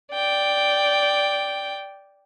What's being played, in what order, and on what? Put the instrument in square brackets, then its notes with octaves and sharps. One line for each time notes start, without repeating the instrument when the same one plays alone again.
[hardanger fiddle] D5 G5